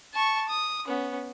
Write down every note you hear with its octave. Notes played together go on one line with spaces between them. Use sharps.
A5 C#6
D#6
B3 C#4